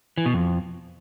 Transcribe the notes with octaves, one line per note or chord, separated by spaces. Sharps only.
E3
B2
F2